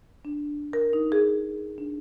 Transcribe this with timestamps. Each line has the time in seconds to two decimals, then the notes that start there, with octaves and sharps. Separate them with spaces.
0.25 D4
0.73 A#4
0.93 D#4
1.12 G#4
1.78 D4